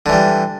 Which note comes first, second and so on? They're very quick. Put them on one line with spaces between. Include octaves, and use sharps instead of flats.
D3 E3 G3